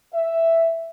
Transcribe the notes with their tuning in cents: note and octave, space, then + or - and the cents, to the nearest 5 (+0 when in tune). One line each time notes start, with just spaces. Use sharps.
E5 +5